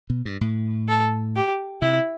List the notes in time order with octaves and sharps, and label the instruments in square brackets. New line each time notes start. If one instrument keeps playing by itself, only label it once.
[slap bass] B2
G2
A2
[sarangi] A4
G4
[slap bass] C3 [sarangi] E4